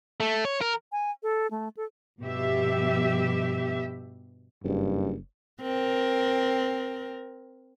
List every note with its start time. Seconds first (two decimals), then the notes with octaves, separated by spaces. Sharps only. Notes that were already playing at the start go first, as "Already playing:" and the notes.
0.20 A3
0.45 C#5
0.62 A#4
0.92 G#5
1.23 A4
1.51 A3
1.77 A4
2.20 G2 B2 F3 G4 E5
4.64 F#1 G2
5.62 C4 A#4